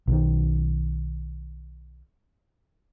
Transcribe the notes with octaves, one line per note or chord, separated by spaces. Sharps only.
B1 D#3